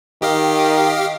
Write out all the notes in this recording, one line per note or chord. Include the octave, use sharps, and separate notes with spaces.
D#3 G4 D#5 F5